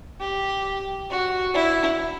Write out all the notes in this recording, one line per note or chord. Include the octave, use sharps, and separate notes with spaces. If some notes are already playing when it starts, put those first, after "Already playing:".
G4
F#4
E4